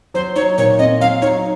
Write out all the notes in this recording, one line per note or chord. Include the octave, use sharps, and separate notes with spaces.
F#3 C5
D#4 C#5
A#2 C#5
C4 D#5
F#3 F5
D#4 C#5